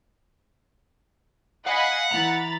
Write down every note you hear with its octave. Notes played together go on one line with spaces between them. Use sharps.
D#5 F5 F#5 G#5 B5
E3 A#5 B5 A6